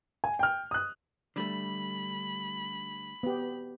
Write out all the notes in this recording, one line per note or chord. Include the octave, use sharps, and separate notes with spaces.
G#5
G5 F6
D#6 F#6
D3 G3 A3 B5
B3 G4